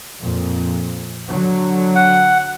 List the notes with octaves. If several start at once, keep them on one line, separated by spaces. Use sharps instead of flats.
F2 A#2
D3 F#3
F#5